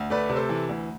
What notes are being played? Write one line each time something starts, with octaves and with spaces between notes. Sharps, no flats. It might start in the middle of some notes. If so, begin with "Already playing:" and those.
Already playing: D2
A3 B4 D5
C3
A4 C5
E3
D2